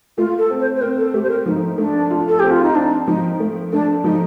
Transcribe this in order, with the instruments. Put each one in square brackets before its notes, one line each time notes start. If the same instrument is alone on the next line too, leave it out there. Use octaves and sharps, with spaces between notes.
[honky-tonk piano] A3 [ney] F4
[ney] A4
[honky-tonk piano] C4
[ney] C5
C5
[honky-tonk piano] C4 [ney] A#4
[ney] A4
[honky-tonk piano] A3 [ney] G4
[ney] C5
A#4
[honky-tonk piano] F3 [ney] D#4
[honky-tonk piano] A3 [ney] D4
[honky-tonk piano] F4
[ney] A4
[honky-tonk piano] C4 [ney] G4
[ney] F4
D#4
[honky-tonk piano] C4 [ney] D4
[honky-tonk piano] F3 [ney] D#4
[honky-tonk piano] A3
[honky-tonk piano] A3 [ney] D4
[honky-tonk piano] F3 [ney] D#4